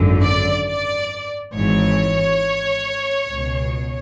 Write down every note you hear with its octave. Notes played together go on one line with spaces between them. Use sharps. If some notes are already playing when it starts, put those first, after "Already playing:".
Already playing: G#1 F#2 D3
D5
D5
G#1 G#2 E3 C#5
C#2 B2